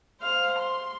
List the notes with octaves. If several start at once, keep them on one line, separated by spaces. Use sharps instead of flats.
C5 F5
C6